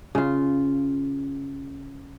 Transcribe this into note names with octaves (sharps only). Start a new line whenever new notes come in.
C#3 F4